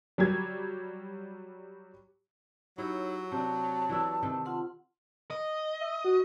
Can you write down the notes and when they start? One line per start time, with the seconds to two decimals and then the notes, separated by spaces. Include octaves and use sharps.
0.18 F#3 G3 G4 G#6
2.78 F#3 D#4 E4 G4 C#5
3.32 C3 D4 G4 A5
3.89 E3 D4 E5
4.23 C3 D#3 E5
4.45 F4 F#5 C6
5.30 D#5
5.81 E5
6.05 F#4